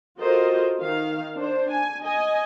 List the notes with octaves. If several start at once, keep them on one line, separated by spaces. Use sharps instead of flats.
F4 F#4 A4 A#4 C5 D#5
D#3 F5
D4 C5
G#5
D#5 G#5